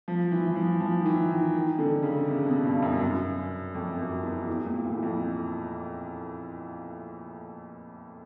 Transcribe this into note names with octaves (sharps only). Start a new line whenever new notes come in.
F3
E3
E3
F3
F3
D#3
E3
D#3
D#3
D3
C#3
C3
B2
G2
F#2
F#2
F2
F#2
E2
E2
A#2
A2
F2